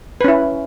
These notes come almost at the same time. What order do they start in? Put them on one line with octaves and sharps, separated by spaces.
B4 C#4 E4